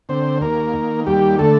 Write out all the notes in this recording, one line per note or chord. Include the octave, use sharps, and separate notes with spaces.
D3 C4 C5
D#2 A#3 A#4
D#3
D#2 G3 G4
D3 A3 A4